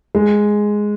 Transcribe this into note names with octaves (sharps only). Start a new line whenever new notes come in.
G#3